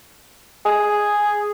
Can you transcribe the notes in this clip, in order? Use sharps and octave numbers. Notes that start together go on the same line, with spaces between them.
G#4